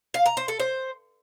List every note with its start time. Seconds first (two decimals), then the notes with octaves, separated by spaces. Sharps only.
0.14 F5
0.26 A#5
0.37 C5
0.48 A4
0.60 C5